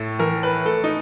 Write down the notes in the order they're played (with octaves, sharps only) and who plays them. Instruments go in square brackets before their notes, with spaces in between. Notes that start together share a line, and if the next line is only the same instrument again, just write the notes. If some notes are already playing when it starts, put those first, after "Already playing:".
Already playing: [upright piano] A2 [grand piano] A4
[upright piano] E3 [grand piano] A#4
[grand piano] B4
[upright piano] A3 [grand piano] A4
[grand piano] D#4